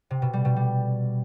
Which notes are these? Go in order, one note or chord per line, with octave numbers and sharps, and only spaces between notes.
C3
B2
G3
B2
G3